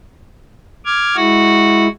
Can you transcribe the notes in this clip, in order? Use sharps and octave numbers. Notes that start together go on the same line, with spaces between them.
D6 F6 G#6
G#3 E4 F#4